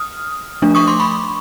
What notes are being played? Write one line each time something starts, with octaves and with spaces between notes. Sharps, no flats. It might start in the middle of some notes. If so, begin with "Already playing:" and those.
Already playing: D#6 F6
F3 A3 D4
C#6 D#6
C6 D6
B5 C#6